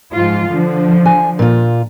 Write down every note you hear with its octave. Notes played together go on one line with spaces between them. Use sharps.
G#2 F3 F4
D3 F3
G#5
A#2 F4